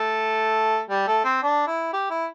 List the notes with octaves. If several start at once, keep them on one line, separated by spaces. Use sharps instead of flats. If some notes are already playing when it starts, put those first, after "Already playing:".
Already playing: A3
G3
A3
C4
D4
E4
G4
E4